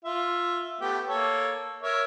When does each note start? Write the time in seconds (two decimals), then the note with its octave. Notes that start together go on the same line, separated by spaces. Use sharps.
0.05 F4 E5
0.81 A3 B3 G4
1.08 A#3 A4 C#5
1.83 A#4 C#5 E5